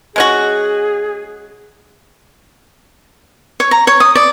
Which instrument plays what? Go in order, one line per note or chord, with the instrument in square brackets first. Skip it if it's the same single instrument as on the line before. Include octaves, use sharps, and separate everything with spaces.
[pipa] G#3 C#4 F#4 [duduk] G#4
[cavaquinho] C#5
A#5
C#5
D#6
D5